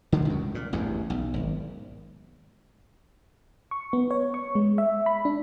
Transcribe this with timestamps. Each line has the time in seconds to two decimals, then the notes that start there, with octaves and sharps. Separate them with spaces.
0.12 D3 D#3 G#3
0.25 C#2 F#2
0.55 A#2
0.73 A1 E2 G2
1.10 B1
1.34 G#1
3.71 C#6
3.93 B3
4.11 C#5
4.34 C#6
4.55 G#3
4.78 E5
5.06 B5
5.25 D4